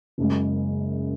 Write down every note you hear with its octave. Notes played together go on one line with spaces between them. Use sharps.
F#1 F#2 C#3 G#3